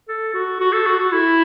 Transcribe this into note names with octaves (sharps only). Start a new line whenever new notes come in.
A4
F#4
F#4
A4
F#4
F#4
E4